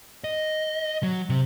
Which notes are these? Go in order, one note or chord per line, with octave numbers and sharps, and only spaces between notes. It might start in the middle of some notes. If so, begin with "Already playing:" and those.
D#5
F#3
C3